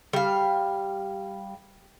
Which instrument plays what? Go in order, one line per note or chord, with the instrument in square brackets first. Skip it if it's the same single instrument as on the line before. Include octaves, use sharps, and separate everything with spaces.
[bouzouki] G3 F5